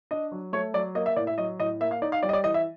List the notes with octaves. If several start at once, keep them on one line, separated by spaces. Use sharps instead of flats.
D4 D#5
F#3
A3 C#5
F#3 D5
A#3 D#5
E5
A2 D5
E5
F#3 D#5
A2 D#5
A#3 E5
F5
D#4 D5
F5
G3 D5
D#5
D5
E3 D#5
E5